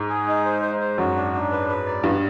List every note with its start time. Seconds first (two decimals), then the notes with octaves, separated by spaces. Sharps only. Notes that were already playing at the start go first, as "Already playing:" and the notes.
Already playing: G#2
0.09 G#4
0.27 D#4
0.45 C5
0.62 C5
0.80 C5
0.98 F#2 F#4
1.16 D4
1.33 D4
1.51 B4
1.68 B4
1.86 D5
2.03 G2 B3